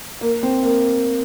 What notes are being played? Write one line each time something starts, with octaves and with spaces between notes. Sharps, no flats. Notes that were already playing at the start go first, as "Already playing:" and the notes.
A#3
C4
A#3